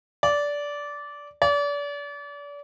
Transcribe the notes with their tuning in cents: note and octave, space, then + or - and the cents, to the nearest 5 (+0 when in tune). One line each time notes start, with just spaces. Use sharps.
D5 -15
D5 -35